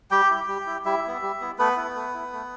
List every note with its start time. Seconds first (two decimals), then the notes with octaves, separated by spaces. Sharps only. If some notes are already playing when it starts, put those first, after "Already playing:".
0.11 G3 G4 G5
0.30 E4
0.48 G3
0.66 E4
0.85 G3 E4 E5
1.04 B3 E4
1.22 G3
1.41 B3 E4
1.59 A3 B3 B4
1.77 E4
1.95 A3
2.14 E4
2.33 A3